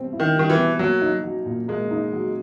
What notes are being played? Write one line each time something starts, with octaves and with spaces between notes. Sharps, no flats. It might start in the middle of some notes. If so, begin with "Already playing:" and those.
Already playing: B2 G3 C4
E4
D#3
D#3 G3
E3
B2
F#3 A#3
D#4
F#3
A#2
G#3 A#3
D#4
F#3